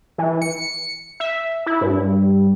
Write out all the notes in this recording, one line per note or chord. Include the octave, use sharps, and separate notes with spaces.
E3
C#7
E5
E4
G2